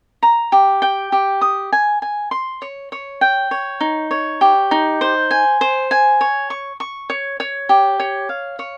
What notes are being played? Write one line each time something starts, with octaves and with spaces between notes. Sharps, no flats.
A#5
G4
G5
G4
D#6
G#5
G#5
C6
C#5
C#5
G5
C#5
D#4
C#5
G4
D#4
C5
G#5
C5
G#5
C#5
C#6
C#6
C#5
C#5
G4
C#5
F5
C#5